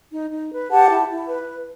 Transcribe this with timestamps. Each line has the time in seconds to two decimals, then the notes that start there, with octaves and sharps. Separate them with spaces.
0.12 D#4
0.31 D#4
0.51 B4
0.70 G4 F#5 A5
0.89 E4
1.09 E4
1.28 B4